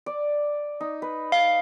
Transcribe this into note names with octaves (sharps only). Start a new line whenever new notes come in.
D5
D#4
B4
F5